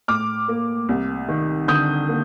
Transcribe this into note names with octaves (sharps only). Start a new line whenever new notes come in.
A2 D6 F6
A#3
C2
D#3
D3 D#6 G6
A#3